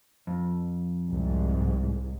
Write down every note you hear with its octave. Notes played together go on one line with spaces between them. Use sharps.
F2
C2 G#2